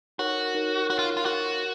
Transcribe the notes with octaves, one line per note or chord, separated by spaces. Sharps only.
D#4 F#4 A#4 C#5
D#4 A#4 C#5
D#4 F#4 A#4 C#5
F4
F4
D#4 F#4 A#4 C#5